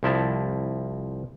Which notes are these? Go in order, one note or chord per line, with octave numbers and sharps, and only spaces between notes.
C2 F3 E4 A5